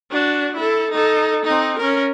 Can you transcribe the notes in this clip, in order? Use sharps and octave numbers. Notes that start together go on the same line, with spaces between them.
D4 F#4
E4 A4
D#4 A4
C4 D#4
C#4 A#4